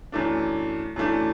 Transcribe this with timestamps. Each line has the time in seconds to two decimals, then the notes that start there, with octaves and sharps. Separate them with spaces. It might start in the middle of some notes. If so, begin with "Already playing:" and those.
0.12 F#2 E3 A3 D4
0.96 F#2 E3 A3 D4